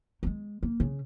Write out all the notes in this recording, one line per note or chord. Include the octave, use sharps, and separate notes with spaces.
A#3
G#3
A#3
C#3